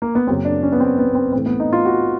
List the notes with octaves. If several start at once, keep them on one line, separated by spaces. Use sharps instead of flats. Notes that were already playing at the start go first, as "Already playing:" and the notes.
A#3
B3
F#2 C#3 F#3 A#3 C4
D4
C#4
B3
C4
B3
C4
A2 E3 A3 C4
B3
D#4
F4
F#4